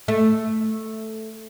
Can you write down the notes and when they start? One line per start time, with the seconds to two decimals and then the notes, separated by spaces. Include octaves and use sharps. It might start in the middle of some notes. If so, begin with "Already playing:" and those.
0.08 A3